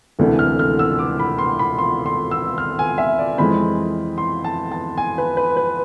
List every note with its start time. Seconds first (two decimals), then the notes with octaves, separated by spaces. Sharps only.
0.19 E1 D2 C3 E3 A3
0.39 F6
0.59 F6
0.79 E6
0.99 D6
1.20 B5
1.38 C6
1.59 B5
1.78 C6
2.06 C6
2.31 E6
2.58 F6
2.79 G#5
2.98 E5
3.19 D5
3.38 F2 E3 G#3 C4 B5
4.18 C6
4.44 A5
4.72 A5
4.98 G#5
5.18 B4
5.37 B4
5.57 B4